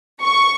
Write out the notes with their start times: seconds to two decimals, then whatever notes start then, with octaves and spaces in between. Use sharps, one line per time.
0.22 C#6